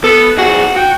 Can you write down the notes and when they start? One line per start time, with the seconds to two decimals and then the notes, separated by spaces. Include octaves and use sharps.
0.04 B3 A4
0.38 F2 F#4 G#4
0.76 F#4 G5